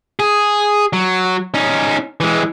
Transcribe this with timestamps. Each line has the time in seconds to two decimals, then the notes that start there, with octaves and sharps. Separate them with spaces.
0.20 G#4
0.93 F#3
1.54 C#4 D#4
2.20 E3 G#3